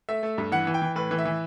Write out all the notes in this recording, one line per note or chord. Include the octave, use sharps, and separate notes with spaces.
A3 E5
A3
G2
E3 F#5
E3
G5
E3
A2 B4
E3
E5
E3